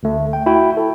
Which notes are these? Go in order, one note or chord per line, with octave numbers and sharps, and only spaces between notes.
D2 A3
G5
E4 F#4 G5
A4